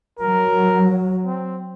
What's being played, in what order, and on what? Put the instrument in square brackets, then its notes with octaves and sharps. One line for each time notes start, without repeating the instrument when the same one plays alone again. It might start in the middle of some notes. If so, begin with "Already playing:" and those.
[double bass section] F#3 [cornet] A#4
[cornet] C4